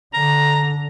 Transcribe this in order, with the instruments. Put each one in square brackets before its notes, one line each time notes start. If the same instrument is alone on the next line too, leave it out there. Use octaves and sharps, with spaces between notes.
[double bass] D3 [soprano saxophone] A#5